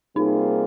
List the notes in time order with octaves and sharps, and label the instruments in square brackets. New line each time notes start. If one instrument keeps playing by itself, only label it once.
[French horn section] C3 G3 A#3 F4 G#4 [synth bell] D#4